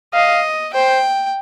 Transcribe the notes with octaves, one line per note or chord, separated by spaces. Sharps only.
D#5 F5
C5 G5